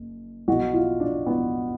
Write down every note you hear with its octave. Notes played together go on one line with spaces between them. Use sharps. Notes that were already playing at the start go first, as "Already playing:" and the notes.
Already playing: F#1
B1 B2 F#4
F4
D4
B3